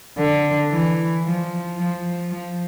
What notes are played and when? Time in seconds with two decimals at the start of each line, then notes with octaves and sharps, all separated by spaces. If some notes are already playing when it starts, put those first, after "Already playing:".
0.18 D3
0.72 E3
1.24 F3
1.78 F3
2.31 F3